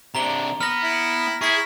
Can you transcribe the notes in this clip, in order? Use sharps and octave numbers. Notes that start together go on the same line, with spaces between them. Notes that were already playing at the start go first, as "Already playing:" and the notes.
C3 D4 A#5 G7
B3 F6 A#6
E4
E4 G#4 C#6 B6